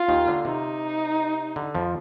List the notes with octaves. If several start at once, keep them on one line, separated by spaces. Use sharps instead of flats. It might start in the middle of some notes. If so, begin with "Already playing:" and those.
Already playing: F4
D#2 D#3
D3
C3 D#4
D3
F2 F3